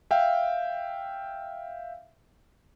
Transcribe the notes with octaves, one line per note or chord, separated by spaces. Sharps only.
E5 F5 G5